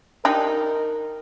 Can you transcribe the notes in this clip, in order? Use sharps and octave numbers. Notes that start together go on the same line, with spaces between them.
D4 D#4 G4 A#4